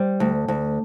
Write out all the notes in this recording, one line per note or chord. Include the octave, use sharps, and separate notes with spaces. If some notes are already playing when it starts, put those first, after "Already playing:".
Already playing: G3 C5
D2
D2